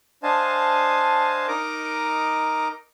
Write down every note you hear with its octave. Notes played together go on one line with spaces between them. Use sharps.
D4 C5 D#5 F5 G#5 A5
D#4 A#4 D#5 A#5 D6